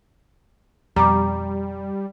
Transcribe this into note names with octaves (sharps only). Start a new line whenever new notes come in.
F2 B2 G3 A#5 D6